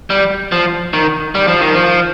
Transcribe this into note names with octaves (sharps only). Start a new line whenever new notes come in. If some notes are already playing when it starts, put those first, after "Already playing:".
G3
F3
D#3
G3
F3
D#3
F3